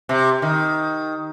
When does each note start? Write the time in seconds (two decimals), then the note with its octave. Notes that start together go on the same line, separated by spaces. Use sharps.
0.09 C3
0.42 D#3